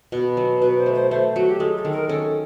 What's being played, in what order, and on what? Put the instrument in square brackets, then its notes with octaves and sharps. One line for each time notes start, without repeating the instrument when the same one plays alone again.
[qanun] B2
F#3
[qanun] B2 [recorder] B4
[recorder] C5
[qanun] A3
[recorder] C5
[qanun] A3 [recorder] C5
[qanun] F#3 [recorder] F#4
[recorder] G4
[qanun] G#3 [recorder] A4
[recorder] A4
[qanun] D#3
[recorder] A#4
[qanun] C#4 [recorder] A4